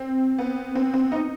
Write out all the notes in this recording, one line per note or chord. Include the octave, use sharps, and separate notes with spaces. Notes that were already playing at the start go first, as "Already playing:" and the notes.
Already playing: C4
B3
C4
C4
D#4